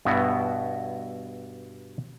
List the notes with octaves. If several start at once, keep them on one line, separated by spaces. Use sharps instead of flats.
G2 B2 B3 E4 F#4